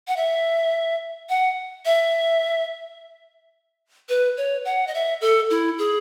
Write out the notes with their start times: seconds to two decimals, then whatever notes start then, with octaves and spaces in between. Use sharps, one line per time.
0.08 F#5
0.17 E5
1.29 F#5
1.85 E5
4.09 B4
4.37 C#5
4.65 F#5
4.87 D#5
4.94 E5
5.21 A4
5.50 E4
5.78 G#4